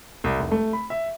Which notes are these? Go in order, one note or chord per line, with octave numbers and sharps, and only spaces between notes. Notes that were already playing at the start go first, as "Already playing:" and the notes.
C2
F1
A3
B5
E5